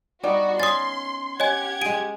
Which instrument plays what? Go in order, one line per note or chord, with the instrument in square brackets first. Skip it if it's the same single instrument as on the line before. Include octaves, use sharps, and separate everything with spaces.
[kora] G3 B3 D#4 [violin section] F#4
[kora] C#4 [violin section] C6 [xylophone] D#6 A6
[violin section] G4 F#5 G#6 [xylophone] C#5 D#5 G#5
[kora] G#3 G#4 [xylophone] D7 D#7